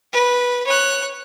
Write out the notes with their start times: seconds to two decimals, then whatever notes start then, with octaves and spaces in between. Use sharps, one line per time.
0.12 B4
0.66 C#5 F#6